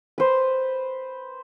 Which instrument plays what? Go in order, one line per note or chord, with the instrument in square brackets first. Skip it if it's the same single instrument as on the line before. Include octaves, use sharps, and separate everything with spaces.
[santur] B4 C5